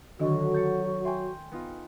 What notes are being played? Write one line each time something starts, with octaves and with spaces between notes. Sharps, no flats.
D2 D3 D#3 F#3 D4 F#4 D#5
G6 A6 C#7
E5 G5 G#5 C6
B3 D#4 F4